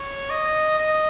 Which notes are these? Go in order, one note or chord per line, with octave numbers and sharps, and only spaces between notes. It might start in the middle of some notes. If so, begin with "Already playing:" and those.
Already playing: C#5
D#5
D#5